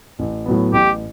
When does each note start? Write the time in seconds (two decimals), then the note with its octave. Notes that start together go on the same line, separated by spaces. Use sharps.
0.19 A1
0.46 A2 F#3 B3
0.73 A1 G4